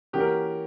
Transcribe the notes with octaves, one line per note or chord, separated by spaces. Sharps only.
E3 A#3 C#4 F#4 G4
A#4